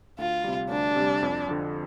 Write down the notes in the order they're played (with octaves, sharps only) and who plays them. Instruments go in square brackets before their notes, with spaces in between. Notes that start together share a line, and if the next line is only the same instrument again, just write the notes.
[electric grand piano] D2 [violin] F4
[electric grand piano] C3 G3
[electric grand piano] D2 [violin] D4
[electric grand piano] C3 G3
F2
D3 F3